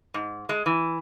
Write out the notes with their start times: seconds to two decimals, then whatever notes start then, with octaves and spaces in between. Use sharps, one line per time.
0.14 G#2
0.49 G#3
0.66 E3